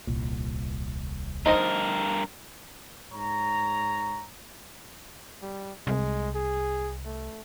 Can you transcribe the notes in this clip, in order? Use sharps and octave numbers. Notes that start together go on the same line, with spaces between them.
D#1 C2 A#2
G2 D#4 A#4 C5 D#5
G#2 C#5 A#5
G3
C2 G#3
G#4
A3